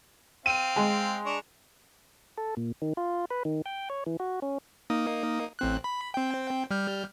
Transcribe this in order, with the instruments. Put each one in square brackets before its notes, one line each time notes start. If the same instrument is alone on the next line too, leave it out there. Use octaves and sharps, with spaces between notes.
[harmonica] C4 F5 G5 [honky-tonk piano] D#7
[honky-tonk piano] G#3
[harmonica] D4 A#5 C#6
[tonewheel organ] A4
A#2
D#3
F4
B4
D#3
G5
C#5
E3
F#4
C#4
[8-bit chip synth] A#3 D#4 D#6
A1 C4 F#6
B5
C4 G5
G3 F6 G6